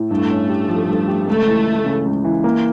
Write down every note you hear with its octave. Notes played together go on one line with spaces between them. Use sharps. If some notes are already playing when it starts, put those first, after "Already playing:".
Already playing: A2
G2 A3
C#4
G4
F3
G2
G4
C#2 A3
E3
E3
C#3
C#2
E3
A#3